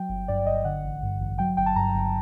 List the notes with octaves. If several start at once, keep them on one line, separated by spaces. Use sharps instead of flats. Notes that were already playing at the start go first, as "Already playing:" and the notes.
Already playing: F#3 G5
G1
G2 D5
G1 D#5
D3 F#5
A1
G2
A1
F#3 G5
G1 G5
A5
G2 A#5
G1